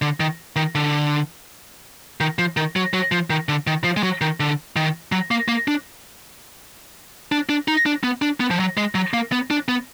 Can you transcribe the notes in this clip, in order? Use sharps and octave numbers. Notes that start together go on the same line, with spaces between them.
D3
D#3
D#3
D3
D#3
F3
D#3
F#3
F#3
F3
D#3
D3
D#3
F3
G#3
F#3
D#3
D3
D#3
F#3
A#3
A#3
D4
D4
D4
D#4
D4
B3
D4
B3
F3
F#3
G#3
F#3
A#3
B3
D4
B3